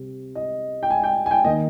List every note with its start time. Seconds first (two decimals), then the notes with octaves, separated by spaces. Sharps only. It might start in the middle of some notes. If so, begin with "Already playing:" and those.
Already playing: C3 G3 C4
0.35 D#5
0.83 G5
0.90 G#5
1.04 G5
1.26 G#5
1.31 G5
1.44 D#3 A#3 D#5